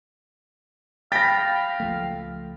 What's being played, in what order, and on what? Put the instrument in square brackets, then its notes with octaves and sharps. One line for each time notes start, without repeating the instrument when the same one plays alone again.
[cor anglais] F5 [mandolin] G5 B5 [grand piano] A6 A#6
[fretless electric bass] C#2 F3 A3